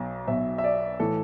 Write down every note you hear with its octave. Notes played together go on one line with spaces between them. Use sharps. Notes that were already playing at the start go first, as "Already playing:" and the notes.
Already playing: B1 B2
B1 B2 E5
E5
D5
A2 E3 A4